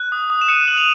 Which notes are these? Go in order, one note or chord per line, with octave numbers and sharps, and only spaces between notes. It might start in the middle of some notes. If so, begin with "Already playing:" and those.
Already playing: F#6
D#6
D#6
E7
F#6 C#7 D#7
F#6 F#7
D#7 F7